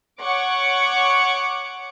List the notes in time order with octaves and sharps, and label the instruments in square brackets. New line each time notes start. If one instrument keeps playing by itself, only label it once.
[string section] C#5 F#5 C#6 D6